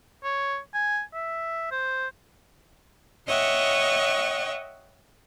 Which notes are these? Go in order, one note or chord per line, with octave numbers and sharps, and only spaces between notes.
C#5
G#5
E5
C5
C#5 D#5 E5 F#5 G5 C#6